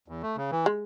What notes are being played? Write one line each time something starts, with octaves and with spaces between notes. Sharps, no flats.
E2
A3
C#3
E3
G#3